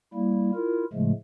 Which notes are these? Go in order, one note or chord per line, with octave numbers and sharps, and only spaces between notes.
G3 A#3 E4
E4 F4 A#4
A2 C#3 F3 G#3 A3